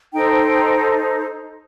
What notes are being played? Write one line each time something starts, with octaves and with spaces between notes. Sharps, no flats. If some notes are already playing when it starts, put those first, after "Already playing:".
D#4 A4 C5 G5